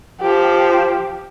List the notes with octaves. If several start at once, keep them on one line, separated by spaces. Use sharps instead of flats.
F3 G4